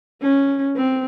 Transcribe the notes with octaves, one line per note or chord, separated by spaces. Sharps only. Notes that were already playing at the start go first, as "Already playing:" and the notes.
C#4
C4